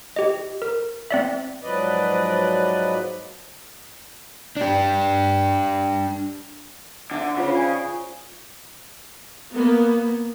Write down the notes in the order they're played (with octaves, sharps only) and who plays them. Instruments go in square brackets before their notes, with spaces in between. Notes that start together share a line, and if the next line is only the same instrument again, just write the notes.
[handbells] G4 D#5
A#4
C4 D5 E5
[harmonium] G#2 F3 F#3 B4 D5 D#5
[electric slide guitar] D4 G4
[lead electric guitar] D3 [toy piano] D#4 E5 F#5
[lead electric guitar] C#3 [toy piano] F4 C5 B5
[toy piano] D5 G5 G#5
[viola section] A#3 B3